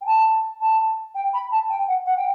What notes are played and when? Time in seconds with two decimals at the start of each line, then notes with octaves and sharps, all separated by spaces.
0.01 G5
0.06 A5
0.60 A5
1.14 G5
1.33 B5
1.51 A5
1.69 G5
1.87 F#5
2.05 F#5
2.16 G5